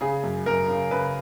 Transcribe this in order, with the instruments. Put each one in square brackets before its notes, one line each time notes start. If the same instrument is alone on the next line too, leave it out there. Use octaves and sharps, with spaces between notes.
[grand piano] C#3 G#4
F#2
F#2 A#4
C#3
C#3 B4